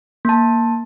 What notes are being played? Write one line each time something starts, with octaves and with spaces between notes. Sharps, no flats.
A#3 A5